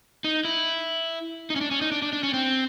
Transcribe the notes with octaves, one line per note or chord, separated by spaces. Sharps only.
D#4
E4
D#4
C#4
D4
C#4
D#4
D4
D4
D4
C#4
C4